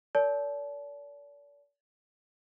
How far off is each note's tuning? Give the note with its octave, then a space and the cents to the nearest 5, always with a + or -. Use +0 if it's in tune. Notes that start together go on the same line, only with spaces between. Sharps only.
A#4 -20 D5 -40 A5 -25